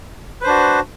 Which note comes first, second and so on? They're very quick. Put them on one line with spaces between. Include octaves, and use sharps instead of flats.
B4 C5 D4 F#4